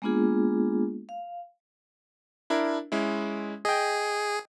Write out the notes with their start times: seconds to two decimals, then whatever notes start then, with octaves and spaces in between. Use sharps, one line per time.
0.02 G#3 A#3 B3 D4 F4 G#4
1.09 F5
2.50 D4 E4 A#4
2.92 G#3 C#4 E4
3.65 G#4 D#5 G5